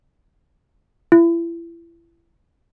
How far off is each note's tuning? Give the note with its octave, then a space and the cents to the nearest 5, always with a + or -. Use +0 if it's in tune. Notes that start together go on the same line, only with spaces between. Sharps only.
E4 +35